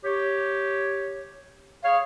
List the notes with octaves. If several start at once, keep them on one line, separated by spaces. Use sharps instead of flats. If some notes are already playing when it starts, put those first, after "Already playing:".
G4 C#5
G#4 C#5 F5